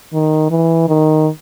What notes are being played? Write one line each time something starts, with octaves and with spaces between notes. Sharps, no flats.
D#3
E3
D#3